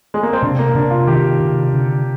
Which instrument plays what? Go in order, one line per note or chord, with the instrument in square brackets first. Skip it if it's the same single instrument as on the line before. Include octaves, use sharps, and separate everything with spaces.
[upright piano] G#3
A#3
C4
[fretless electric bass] C3 [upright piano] D4
[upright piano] A#3
[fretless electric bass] C3 [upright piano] D4
[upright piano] F4
[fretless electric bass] D#3 [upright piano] G4
[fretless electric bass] C3
D3